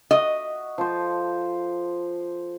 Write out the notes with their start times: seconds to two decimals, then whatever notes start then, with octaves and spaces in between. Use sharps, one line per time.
0.11 F#4 D#5 E5
0.78 F3 A4 C5